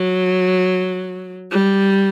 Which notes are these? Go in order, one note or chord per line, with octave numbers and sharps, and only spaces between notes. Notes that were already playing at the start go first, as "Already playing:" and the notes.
Already playing: F#3
G3